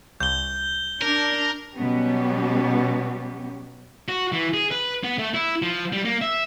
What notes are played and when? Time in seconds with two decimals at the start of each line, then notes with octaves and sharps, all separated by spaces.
0.20 C2 G6 G7
1.02 D4 A#4
1.75 B2 F#3 G3 B3 C#4 G4
4.09 F#4
4.32 E3
4.54 G#4
4.71 B4
5.04 B3
5.18 A3
5.34 E4
5.62 F3
5.92 G3
6.05 A#3
6.22 E5